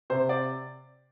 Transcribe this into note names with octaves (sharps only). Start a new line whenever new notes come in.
C3 C5
D5